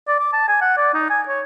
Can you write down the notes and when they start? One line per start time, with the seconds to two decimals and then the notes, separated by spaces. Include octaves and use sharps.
0.08 D5
0.20 D6
0.33 A5
0.48 G#5
0.61 F#5
0.77 D5
0.94 D#4
1.10 G#5
1.28 C#5